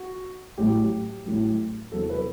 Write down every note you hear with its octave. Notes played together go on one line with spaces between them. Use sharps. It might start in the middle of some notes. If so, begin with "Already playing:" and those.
Already playing: F#4
A1 A2 F#3 G4
A1 A2 F#3
E2 C3 F#3 A4
B4